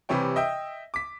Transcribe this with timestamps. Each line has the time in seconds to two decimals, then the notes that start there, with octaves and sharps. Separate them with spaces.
0.09 C3 E3 G3 C#5 G5
0.36 D#5 E5 G5
0.94 D6 B6